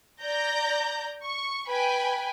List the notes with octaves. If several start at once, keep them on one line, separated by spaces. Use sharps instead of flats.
D5 A#5 G6 A#6
C#6
B4 G5 G#5 B5